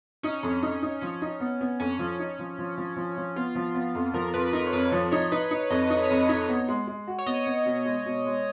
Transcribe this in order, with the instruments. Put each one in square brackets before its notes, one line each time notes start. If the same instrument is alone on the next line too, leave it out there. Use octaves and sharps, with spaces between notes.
[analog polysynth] C#4 [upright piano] D#4
[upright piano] F2
D#4
D#4
[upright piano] F3 [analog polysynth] C#4
[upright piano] D#4
B3
B3
[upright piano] F2 [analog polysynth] C#4
[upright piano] F3
D#4
F3
F3
F3
F3
F3
[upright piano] B3 [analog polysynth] F4
[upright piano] F3
B3
F2
[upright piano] F3 [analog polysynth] A#4
[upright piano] F2 [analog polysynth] B4
[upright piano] D#4 [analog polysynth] A#4
[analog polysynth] C#5
[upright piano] F2 [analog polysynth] B4
[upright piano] F3 [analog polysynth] C#5
[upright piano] D#4 [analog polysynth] C#5
[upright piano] D#4 [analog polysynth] B4
[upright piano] D#4 [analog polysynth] C#5
[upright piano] F2 [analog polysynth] D#5
[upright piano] D#4 [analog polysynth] C#5
[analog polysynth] C#5
[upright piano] F2 [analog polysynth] D#5
[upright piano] D#4 [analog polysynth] C#5
[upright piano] B3
G#3
G#3
F#4
[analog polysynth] C#5
[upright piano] B3 [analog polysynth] D#5
[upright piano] B3
B2
G#3
B2
G#3